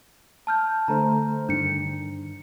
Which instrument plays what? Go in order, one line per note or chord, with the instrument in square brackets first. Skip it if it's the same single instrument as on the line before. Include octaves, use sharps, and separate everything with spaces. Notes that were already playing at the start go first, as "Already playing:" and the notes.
[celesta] A5 F6 G6
[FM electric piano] D3 A3 C5 [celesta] A#5
[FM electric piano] G2 D3 D#3 [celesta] D4 C#7